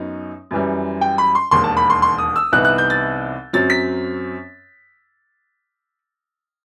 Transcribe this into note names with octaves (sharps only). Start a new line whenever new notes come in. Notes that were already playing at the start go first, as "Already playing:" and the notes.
Already playing: F#2 F#3 B3 D#4
F#2 E3 G3
G5
B5
C6
E1 D#2 D#3 C6
A5
B5
C6
C6
D#6
E6
C2 C3 E3 B3 D#4 F#6
F#6
G6
A6
F#2 F#3 C4 A6
B6